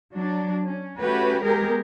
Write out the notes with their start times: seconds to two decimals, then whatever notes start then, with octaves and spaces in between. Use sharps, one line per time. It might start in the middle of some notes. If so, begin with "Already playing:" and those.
0.13 F#3 D4
0.65 C#4
1.01 A3 C#4 F#4 G4 B4
1.44 G#3 B3 G4 G#4 A#4